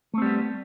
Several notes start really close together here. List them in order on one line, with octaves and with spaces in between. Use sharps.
A3 C4 G3 B3